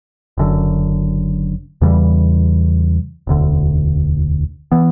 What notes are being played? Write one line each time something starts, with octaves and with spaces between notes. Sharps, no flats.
F#1 F#2 D3
E2 C#3 E3 G3
E1 D2 D3
E3 B3